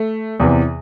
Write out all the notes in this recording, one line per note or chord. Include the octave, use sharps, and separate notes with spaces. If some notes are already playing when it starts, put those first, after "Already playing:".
Already playing: A3
E2 C3 E3